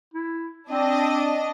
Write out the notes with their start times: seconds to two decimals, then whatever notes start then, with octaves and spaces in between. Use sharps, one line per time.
0.14 E4
0.70 C4 D4 D#5